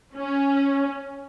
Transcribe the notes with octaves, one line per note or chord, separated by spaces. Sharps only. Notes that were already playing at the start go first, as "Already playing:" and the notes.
C#4